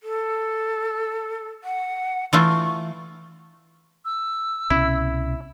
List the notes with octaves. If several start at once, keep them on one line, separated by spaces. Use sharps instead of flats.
A4
F#5
E3 A3 F4 C#6
E6
C2 B2 C#4 E4